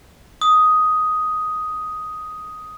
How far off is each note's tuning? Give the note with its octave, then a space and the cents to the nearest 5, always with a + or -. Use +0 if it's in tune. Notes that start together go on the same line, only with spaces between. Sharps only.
D#6 +5